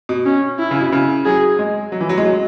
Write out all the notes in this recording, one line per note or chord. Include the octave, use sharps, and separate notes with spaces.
B2
C#4
E4
C#3
B2
C#3
F#3 G#4
G#3
F#3
E3
F#3
G#3
F#3